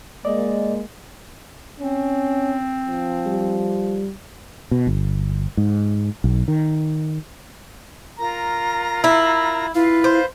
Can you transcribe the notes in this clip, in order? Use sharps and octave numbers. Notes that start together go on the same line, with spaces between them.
G#3 A#3 D5 D#5
C4 C#4
F3
G3
B2
G1
G#2
B1
D#3
F4 A#4 A#5
E4
E4 F4 B4 F5
C5